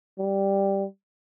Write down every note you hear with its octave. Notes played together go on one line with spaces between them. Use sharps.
G3